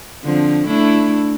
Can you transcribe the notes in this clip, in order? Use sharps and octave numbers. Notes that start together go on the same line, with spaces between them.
D3 F3 C4
A3 D4 E4